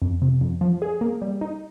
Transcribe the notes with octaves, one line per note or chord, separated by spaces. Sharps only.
F2
C3
F2
F3
G#4
A#3
G3
D#4